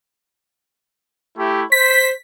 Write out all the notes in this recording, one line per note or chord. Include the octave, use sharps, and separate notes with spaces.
A3 E4 G4
C5 B6